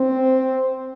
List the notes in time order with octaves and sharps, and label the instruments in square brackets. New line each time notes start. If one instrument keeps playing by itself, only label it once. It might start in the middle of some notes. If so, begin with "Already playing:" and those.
Already playing: [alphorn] C4